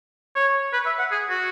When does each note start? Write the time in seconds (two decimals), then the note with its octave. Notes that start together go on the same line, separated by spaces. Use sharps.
0.35 C#5
0.73 B4
0.86 E5
0.99 F#5
1.11 G#4
1.30 F#4